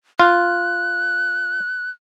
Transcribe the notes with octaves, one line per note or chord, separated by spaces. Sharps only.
F4 F#6